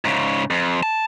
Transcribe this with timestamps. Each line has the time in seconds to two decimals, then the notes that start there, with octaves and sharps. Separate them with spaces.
0.05 G#2 C#3
0.50 F2
0.83 A5